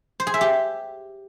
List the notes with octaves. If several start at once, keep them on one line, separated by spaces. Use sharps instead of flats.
C5
G#4
E5
G4